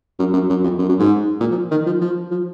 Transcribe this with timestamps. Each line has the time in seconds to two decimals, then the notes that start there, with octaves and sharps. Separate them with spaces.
0.19 F#2
0.33 F#2
0.49 F#2
0.64 F2
0.79 F#2
0.89 F#2
0.99 G#2
1.40 A#2
1.51 F3
1.71 D#3
1.86 F3
2.01 F3
2.31 F3